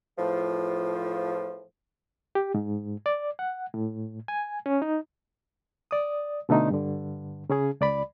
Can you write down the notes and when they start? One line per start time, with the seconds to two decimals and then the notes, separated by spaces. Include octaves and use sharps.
0.18 E2 A2 F3
2.35 G4
2.54 G#2
3.06 D5
3.39 F#5
3.74 A2
4.28 G#5
4.66 C#4
4.82 D#4
5.91 D5 D#6
6.49 B2 D3 A3 D#4
6.70 G2 D3
7.50 C#3 C#4 G#4
7.81 C#2 D5 B5